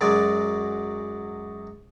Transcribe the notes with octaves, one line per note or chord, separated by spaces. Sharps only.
F#2 F#3 G#3 D5 G#5